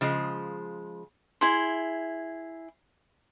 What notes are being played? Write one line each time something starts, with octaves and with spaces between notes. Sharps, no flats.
C#3 F3 G#3
E4 G#4 C6